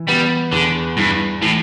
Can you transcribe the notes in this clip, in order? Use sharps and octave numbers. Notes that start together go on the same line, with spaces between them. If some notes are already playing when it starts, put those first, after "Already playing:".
Already playing: E3
G3 B3
E2 D3
G2 E4
A2 E3